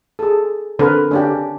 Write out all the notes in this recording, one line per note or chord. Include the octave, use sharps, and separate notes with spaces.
G#4 A4
D3 C4 A#4 B4
C#4 D4 G4